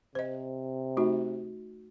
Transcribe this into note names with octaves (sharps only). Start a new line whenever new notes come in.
C3 C5 D#5
A3 D#4 F#4